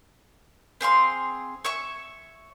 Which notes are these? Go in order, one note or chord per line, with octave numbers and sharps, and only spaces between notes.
C4 G#4 F5 C6
C#5 E5 C#6